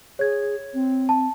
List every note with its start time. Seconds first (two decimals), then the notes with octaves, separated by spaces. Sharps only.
0.19 G#4 C#5 G#6
0.74 C4
1.09 A5